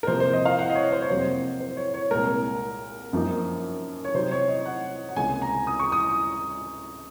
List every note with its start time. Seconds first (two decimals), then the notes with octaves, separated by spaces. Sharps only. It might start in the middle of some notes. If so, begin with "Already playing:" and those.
0.03 A#4
0.07 C3 F3 A#3 C5
0.20 C5
0.33 D#5
0.45 F5
0.59 F#5
0.69 D#5
0.75 C#5
0.92 C5
1.01 C#5
1.09 F2 C3 F#3 A#3 C5
1.60 C5
1.77 C#5
1.94 C#5
2.11 C2 A#2 G#3 A#4
3.13 F#2 F3 A#3 D#4
4.05 C#5
4.14 C3 F#3 C4 D#4 C5
4.31 C#5
4.48 D#5
4.65 F#5
5.09 F#5
5.16 C#2 C3 D#3 A#3 C#4 G#5
5.42 A#5
5.67 D#6
5.79 C#6
5.92 D#6